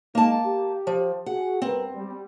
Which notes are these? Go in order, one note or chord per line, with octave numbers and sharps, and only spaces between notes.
G#3 A#3 D#4 A5
G4
F3
F#4 G#4 F#5
G2 C4 A#4 B4
G3